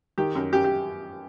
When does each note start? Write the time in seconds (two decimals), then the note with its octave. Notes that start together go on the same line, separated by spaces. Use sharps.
0.18 D#3 G4
0.35 F#2
0.53 F#2 G4
0.64 G4